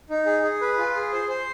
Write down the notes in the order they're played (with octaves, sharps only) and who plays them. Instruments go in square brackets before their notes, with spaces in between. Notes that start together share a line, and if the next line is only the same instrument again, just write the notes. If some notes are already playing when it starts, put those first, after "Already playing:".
[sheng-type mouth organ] D#4
G#4
G#4
B4
F4
G#4
C5
C5